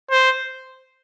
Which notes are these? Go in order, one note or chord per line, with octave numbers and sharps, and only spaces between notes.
C5